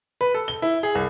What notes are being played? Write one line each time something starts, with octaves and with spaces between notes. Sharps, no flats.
B4
A4
G7
E4
G#4
C2